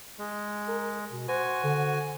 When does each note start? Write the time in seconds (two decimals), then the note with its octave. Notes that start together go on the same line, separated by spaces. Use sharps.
0.19 G#3
0.68 A#4
1.12 B2
1.28 F#4 C5 G#5
1.64 D3